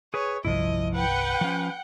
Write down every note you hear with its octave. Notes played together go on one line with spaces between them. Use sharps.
G#4 B4 C#5
G1 C2 F3 E4 D#5
B4 F#5 G5
F3 C#4